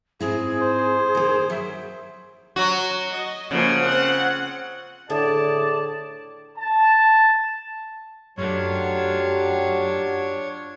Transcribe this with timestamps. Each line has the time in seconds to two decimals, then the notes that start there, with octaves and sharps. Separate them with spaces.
0.20 G#2 C4 E4 G#4
0.62 C5
1.15 D#3 A#3
1.50 F#3 E5
2.56 F#3 F#4
3.11 D#5
3.51 C#3 F3 A#3 F#5
3.82 C4 F#5
5.10 A2 D3 G#4 D5 A5
6.56 A5
8.38 F#2 F#3 A3 D4 F4 G4 C#5